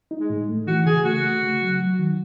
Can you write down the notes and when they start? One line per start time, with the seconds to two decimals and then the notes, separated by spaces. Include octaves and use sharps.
0.11 D#4
0.20 G#3
0.30 A2
0.49 A3
0.67 E3 F#4
0.86 C#3 G#4
1.05 A3 F#4
1.24 A3
1.43 C#3
1.61 F#3
1.80 F#3
1.99 D#3